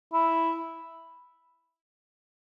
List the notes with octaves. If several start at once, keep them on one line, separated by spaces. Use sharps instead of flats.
E4